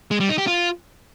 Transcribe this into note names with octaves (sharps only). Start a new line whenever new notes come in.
G#3
G3
D#4
G4
F4